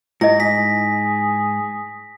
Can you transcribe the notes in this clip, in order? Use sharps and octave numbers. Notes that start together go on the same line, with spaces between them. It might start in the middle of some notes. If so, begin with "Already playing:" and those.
G#2 E4 D#5 A#6
G#4 B6